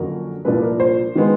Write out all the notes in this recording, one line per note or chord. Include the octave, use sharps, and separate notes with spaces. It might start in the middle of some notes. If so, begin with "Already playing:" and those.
Already playing: F2 D3 F#3 A#3 C#4 A#4
C2 A#2 F3 A#3 D4 B4
A#4
C5
D#3 G#3 B3